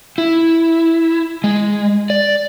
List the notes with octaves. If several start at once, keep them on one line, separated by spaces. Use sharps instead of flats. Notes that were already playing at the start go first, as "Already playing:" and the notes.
E4
G#3
D5